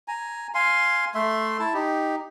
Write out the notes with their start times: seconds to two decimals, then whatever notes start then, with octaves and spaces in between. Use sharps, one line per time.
0.08 G#5 A#5
0.55 F5 G#5 C6
1.15 A3 E5 C6
1.60 E4 A5
1.74 D#4 G4